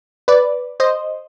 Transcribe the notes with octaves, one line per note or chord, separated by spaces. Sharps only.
B4 D5
C5 D#5